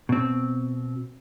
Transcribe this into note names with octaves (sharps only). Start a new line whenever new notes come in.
B2 C4